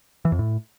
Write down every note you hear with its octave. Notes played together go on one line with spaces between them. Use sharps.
E3
F2
A2